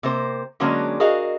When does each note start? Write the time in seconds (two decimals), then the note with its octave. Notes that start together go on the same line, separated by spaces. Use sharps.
0.03 C3 A#3 C5
0.60 D3 F#3 G#3 A#3 C#4 D4
1.00 F#4 G#4 A#4 D#5 F5